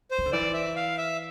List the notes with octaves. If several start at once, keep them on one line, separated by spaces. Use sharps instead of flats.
C5
E3
D3
E3 D5
E5
F5
E5